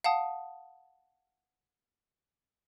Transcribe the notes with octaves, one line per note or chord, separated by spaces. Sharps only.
F5 F#5 A5 D#6